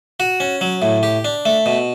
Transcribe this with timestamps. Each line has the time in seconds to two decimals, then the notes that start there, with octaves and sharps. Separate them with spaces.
0.20 F#4
0.40 C#4
0.61 F#3
0.82 A2
1.03 G4
1.25 D4
1.45 A3
1.66 B2